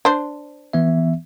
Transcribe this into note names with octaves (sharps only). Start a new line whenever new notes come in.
D4 C5
E3 B3 E5